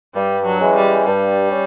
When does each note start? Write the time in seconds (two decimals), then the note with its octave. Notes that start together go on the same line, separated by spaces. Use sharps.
0.15 G2 G3
0.45 F#3
0.60 E3 G#3 C#4
0.75 G3
1.05 G2 G3
1.51 C#4